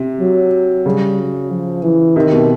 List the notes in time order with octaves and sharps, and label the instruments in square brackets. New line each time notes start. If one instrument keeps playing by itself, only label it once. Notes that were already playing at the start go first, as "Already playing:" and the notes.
Already playing: [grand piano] C3
[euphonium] F#3
[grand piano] C#3 [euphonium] G3
[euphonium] F#3
F3
E3
[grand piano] C3 [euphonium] D#3
[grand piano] B2